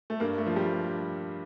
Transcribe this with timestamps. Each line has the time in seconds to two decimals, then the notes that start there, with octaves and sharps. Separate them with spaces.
0.10 A3
0.20 G2 A#3
0.38 A3
0.47 F3
0.56 G3